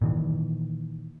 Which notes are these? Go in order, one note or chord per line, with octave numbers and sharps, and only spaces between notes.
A#2 D#3 E3